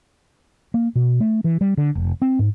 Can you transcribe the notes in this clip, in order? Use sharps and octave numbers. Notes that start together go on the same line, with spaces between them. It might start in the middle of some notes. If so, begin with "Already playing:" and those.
A#3
B2
A3
E3
G3
D3
F1
C4
G#2